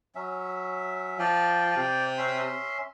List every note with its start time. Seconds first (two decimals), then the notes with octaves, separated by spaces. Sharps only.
0.15 F#3 C#4 E5
1.19 F3 D5 G5
1.77 C3
2.18 C#4 E5 C6